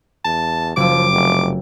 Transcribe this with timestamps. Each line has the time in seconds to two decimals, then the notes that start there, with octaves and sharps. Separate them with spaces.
0.25 E2 A5
0.77 F#1 F3 D6 E6
1.12 F1